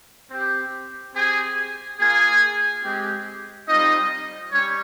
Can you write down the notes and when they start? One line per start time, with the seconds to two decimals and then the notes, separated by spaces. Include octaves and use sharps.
0.30 C4 G4
1.15 C4 G4 G#4 G#5
1.99 A#3 F4 G#4 G#5
2.83 G#3 C4 G4
3.68 G3 C4 D#4 F4 D#5
4.52 G3 C#4 C#5